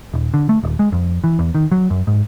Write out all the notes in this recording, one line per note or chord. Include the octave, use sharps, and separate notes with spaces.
D#1
D3
A3
D#1
G#3
F2
E3
E2
D#3
F#3
F#2
G#2